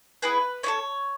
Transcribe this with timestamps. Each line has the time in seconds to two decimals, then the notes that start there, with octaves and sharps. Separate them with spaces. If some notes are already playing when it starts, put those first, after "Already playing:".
0.22 B3 E4 G#4 B4
0.63 C#4 E4 A4 C#5